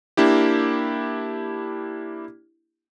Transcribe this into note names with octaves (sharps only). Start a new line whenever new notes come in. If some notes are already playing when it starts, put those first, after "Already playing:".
A#3 D4 E4 G4